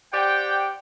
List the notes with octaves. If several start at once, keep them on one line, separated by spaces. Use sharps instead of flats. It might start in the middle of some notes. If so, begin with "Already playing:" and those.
G4 C5 D5 F#5 G5